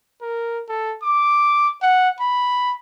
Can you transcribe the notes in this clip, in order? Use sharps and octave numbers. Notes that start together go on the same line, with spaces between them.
A#4
A4
D6
F#5
B5